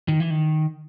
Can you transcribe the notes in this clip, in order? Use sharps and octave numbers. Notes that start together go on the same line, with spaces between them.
D#3
E3
D#3